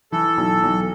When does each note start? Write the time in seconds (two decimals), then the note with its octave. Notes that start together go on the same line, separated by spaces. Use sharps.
0.12 E3 A4
0.38 B1
0.63 B1